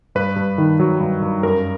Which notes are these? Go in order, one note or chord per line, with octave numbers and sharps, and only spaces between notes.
G2 B4
G2
D#3
F#3
G2
G2
F#2 A#4